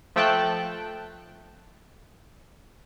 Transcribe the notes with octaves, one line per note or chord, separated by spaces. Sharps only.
F3 A3 G5 A5 F#6